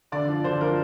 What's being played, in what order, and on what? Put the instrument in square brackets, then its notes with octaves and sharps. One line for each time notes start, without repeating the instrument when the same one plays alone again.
[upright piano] D3 D5
F3
D3 C5
F3 A#4